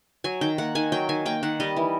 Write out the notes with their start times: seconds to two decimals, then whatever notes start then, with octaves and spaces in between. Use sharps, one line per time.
0.24 F#3 G#5
0.41 D#3 G5
0.58 A#3 F#5
0.75 D#3 G#5
0.92 F#3 G5
1.09 D#3 G#5
1.26 A#3 G5
1.43 D#3 F#5
1.60 G3 D#5
1.76 E3